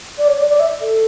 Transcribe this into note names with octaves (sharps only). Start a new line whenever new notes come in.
D5
C#5
D5
D5
E5
A4